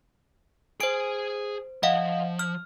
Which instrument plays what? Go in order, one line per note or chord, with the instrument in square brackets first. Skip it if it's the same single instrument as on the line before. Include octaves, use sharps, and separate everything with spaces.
[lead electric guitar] G#4 G#5 [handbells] C5 D7
[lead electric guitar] F3 [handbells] D#5 F5 F#5
[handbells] F6